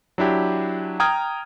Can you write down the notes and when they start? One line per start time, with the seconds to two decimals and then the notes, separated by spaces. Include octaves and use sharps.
0.18 F#3 D4 E4 G4
1.00 G5 A#5 D#6 F6 G#6